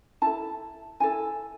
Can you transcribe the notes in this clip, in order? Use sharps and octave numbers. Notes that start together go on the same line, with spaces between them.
E4 A4 A5
E4 A4 G#5